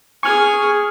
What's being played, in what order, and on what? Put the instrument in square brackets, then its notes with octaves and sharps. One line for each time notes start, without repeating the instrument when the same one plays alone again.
[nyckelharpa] G#4 G#5 [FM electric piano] C#6 F6